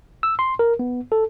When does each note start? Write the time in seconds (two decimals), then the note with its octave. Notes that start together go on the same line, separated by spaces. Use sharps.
0.23 E6
0.39 C6
0.59 A#4
0.79 B3
1.12 A4